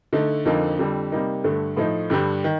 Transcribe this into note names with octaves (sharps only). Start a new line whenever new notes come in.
D3 A3 D#4
F2 D3 F3 A#3 D#4
F2 D3 G3
C3 G3 A#3 D#4
G2 D3 A3
A2 F3 A3 D#4
G2 D3 G3
D#3